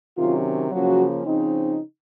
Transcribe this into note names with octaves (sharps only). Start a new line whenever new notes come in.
C3 D#3 F#3 C#4 F4
C#3 F3 F#3 A#3 C#4 F#4
C#3 F3 C4 D#4